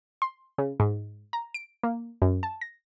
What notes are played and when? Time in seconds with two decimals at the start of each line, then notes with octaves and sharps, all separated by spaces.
0.22 C6
0.58 C#3
0.80 G#2
1.33 A#5
1.54 D7
1.83 A#3
2.22 F#2
2.43 A5
2.61 A#6